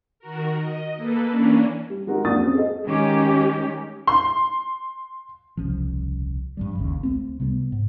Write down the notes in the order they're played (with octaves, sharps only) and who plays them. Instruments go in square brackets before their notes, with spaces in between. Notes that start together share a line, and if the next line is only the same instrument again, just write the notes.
[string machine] D#3 F#4 A#4
D#5
A#3 A4 B4
E3 A#3 C#4 D4
[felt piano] G3
F#3 G#3 D#4 F#4 G4 A#4
F2 A#3 D4 F#4 D#6 A6
C4 C#4
G#4 A4 D#5
[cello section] D#3 G#3 C#4 G4
[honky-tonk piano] C6
[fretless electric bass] D#1 C2 C#3 F3
G2 F3 G3
G1 D#2 C#3
C#2 A3 C4
C3 G3 A#3 B3
G#2